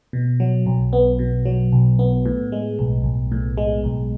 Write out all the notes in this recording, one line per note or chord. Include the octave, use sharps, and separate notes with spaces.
B2
F#3
B1
B3
B2
F#3
B1
B3
A2
G#3
B1
B1
A2
G#3
B1